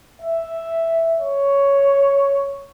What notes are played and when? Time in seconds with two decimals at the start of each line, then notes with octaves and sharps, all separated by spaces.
0.22 E5
1.20 C#5